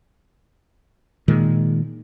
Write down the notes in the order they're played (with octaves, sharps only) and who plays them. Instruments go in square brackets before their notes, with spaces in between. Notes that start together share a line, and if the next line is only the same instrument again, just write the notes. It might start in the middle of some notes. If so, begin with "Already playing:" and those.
[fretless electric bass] A#2 D#3 G#3